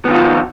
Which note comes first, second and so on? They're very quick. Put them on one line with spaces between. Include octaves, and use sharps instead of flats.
B3 D#3 F4 F#4 F3